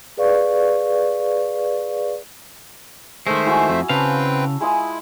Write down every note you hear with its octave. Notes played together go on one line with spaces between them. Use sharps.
G#4 B4 D5 F5 C#6
D#3 G#3 A3 C5 E5
E4 F#4 G#4
F2
C#3 C4 B4 F5 G5 A5
G#3 E4 F4 D#5